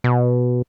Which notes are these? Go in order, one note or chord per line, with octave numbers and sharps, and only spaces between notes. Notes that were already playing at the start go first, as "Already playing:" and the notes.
B2